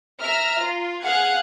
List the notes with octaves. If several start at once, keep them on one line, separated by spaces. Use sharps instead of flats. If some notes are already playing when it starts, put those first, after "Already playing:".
E5 A#5 F6
F4
G#4 F5 F#5 F#6 G#6